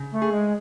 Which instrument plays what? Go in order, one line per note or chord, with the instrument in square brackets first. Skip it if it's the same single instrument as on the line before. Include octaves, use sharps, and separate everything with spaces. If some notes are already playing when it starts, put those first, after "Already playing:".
Already playing: [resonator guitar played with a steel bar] C#3
[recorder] A3
[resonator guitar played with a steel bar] G#4
[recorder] G#3